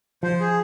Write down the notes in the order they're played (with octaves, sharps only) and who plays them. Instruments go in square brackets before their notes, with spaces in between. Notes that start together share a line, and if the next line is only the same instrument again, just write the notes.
[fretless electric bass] F3 [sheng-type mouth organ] C5
[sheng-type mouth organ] G#4